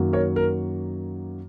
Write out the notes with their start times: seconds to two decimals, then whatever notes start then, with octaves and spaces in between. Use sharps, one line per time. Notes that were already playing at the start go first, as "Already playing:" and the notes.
Already playing: F#2 D#3 F#3 A#3
0.13 A#4 C#5
0.36 A#4